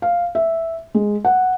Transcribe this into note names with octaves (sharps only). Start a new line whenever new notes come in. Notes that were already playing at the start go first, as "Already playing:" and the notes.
F5
E5
G#3
F#5